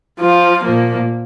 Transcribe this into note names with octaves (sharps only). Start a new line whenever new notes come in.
F3 F4
A#2 F3 A#3